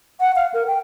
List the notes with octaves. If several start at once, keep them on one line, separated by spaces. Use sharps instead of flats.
F#5
F5
A#4
G5